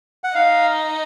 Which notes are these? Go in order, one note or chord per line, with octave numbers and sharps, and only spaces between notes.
F#5
D#4 F5